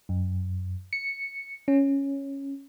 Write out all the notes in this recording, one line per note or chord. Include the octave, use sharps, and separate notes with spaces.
F#2
C#7
C#4